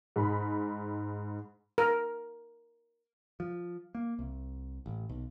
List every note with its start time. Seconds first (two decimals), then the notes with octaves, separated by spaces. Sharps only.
0.16 G#2 B5
1.78 A#4
3.40 F3
3.95 A#3
4.19 C2
4.86 A1
5.09 B1